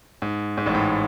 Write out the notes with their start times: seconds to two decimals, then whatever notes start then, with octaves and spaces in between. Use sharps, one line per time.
0.22 G#2
0.57 G#2
0.66 A1 A2
0.75 G#2